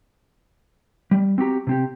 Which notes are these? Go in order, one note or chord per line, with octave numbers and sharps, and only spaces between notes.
G3
C4 F#4 G4 A#5
C3 C4 G4